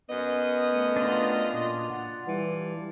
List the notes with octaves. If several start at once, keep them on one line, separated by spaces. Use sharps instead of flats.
F#2 B3 D#5
A3
D4 F4
A#2
F#5
E3 G3